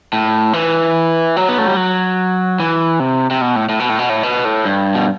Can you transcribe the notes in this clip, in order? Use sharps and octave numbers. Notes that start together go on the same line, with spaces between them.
A2
E3
F#3
B3
A3
G3
F#3
E3
C3
C3
B2
A2
A2
B2
A2
B2
A2
B2
A2
G2
B2